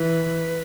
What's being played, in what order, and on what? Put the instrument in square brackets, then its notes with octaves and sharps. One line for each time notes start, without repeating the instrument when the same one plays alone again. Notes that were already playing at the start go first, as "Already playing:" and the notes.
Already playing: [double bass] E3 [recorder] B4